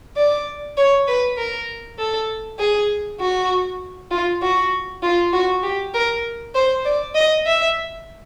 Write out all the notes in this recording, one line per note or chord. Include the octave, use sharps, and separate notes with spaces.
D5
C#5
B4
A#4
A4
G#4
F#4
F4
F#4
F4
F#4
G4
A#4
C5
D5
D#5
E5